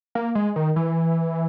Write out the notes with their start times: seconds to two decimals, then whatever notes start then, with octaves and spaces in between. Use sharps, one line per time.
0.15 A#3
0.35 G#3
0.56 D#3
0.76 E3